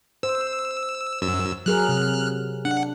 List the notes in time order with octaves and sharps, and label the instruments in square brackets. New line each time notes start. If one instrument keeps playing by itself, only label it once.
[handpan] C5 [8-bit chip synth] E6
[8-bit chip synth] F#2 E6
[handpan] F#3 G#4 A#4 [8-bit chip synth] F6 F#6
[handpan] C3
[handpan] D4 [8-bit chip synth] F#5